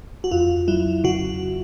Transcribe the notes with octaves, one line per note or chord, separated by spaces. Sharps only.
F#4
F2 F4
F#3 E4
C#3 F#4